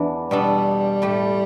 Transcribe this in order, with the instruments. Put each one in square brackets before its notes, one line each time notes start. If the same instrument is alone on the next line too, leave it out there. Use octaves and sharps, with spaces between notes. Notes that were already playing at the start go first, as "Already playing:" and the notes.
Already playing: [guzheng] E2 E3 B3 D4
[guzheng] B2 B3 D4 A4 [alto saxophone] G3
[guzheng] A2 A3 G4